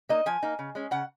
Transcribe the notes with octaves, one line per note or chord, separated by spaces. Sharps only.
A#3 D#4 D#5
F3 G#5
A#3 D#4
C#3
G#3 C#4
C#3 F#5